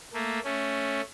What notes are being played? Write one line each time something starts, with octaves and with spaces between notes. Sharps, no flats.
A3 A#3
A3 C#4